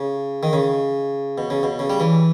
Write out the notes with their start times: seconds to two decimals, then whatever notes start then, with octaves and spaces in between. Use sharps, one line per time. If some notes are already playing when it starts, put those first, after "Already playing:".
Already playing: C#3
0.43 D#3
0.53 C#3
1.38 B2
1.50 C#3
1.63 B2
1.79 C#3
1.90 G3
2.00 E3